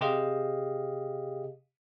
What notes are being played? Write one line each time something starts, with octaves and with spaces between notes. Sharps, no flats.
C3 G4 G#4 D#5 F5